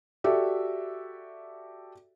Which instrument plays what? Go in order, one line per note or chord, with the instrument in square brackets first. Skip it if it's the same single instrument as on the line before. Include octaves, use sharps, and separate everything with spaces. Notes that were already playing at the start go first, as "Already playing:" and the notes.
[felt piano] F#4 G4 A4 D5 E5